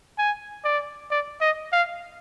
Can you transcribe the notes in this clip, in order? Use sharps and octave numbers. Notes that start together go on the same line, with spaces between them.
G#5
D5
D5
D#5
F5